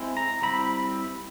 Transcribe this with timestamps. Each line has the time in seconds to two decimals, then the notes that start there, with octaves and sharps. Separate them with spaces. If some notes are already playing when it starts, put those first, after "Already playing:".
Already playing: G#3 C4 E4
0.17 A#5
0.42 G3 C4 E4 B5